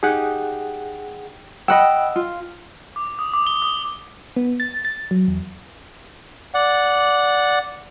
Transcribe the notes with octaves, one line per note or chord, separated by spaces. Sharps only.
D#4 G4 G#4 F#5
D#5 F#5 G5 B5 E6
F4
D6
D#6
D6
G7
D#6
B3
A6
A6
F#3
E2
D5 F#5